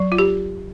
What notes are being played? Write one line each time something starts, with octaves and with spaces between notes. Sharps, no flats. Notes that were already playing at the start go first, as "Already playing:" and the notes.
Already playing: F#3
F4
G4